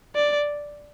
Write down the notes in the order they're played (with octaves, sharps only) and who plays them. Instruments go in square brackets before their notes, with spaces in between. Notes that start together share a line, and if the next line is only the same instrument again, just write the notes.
[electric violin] D5